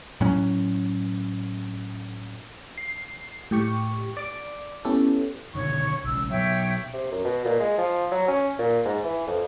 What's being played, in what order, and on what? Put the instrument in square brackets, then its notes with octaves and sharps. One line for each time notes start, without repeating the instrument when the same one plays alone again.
[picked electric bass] A2 F#3 C#4
[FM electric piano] C7
A2 G4 C#6
D5 D6
B3 C#4 E4 G4 A4
[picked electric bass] B2 D3 D#3 [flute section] C#5 C#6
[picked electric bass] B1 C#3 [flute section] E6
[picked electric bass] B2 F#3 [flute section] C#5 E5 G5
[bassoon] C3
F#2
B2
A#2
G#3
F3
F#3
C#4
A#2
G#2
E3
F2